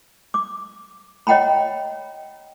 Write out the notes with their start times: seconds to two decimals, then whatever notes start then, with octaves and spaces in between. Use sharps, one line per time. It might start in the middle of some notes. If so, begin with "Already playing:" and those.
0.34 D6
1.27 C#5 D#5 F#5 G5 A#5 B5